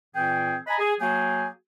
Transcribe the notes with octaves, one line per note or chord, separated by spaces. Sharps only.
A#2 E3 C4 G#4 G5
D#5 G#5 A#5 B5
G#4
F#3 A#3 F#4 G#4 G5 G#5